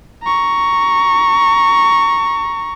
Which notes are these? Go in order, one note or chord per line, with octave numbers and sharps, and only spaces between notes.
A#5 C#6